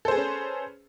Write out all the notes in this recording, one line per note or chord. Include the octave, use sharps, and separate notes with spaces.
C#4 G#4 A4 B4 C5